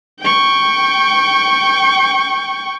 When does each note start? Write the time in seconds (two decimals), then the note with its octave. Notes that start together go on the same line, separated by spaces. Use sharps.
0.21 G5 C#6